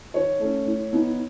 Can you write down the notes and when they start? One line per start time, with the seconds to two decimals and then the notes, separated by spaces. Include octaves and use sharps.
0.14 D#3 C#5
0.39 A3 C#4
0.65 A2
0.92 E3 B3 D#4